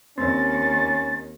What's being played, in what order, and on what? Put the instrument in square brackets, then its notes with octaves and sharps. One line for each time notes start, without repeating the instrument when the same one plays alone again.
[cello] D#2 [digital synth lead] C4 [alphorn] C#4 [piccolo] A6